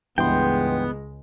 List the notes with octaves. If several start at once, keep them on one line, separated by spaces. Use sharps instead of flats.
C#2 G2 E3 G#3 B3 G5 C6